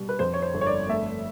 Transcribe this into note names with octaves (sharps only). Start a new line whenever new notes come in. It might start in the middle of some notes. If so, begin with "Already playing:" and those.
Already playing: B2 G3
B4
F2 C5
C#5
C5
G1
C#5
D5
A3 E5